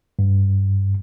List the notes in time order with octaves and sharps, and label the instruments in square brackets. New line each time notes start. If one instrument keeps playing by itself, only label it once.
[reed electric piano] G2